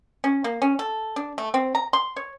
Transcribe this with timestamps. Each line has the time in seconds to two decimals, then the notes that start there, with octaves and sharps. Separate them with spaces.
0.24 C#4
0.44 A#3
0.62 C#4
0.79 A4
1.16 D4
1.38 A3
1.54 C4
1.75 A#5
1.93 C6
2.16 C#5